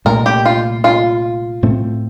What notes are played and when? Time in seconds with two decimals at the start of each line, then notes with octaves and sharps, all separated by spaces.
0.05 C2 A#2 A3 A#4
0.26 G4
0.45 F4
0.84 F4
1.63 A2 A3 C4